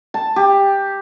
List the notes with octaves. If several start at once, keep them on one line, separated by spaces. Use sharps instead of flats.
A5
G4